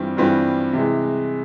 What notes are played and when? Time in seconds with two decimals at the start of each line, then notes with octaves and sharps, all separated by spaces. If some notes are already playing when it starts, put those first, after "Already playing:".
Already playing: G2 E3 G3 C4 F4
0.17 G2 E3 G3 C4 F4
0.73 C3 E3 G#3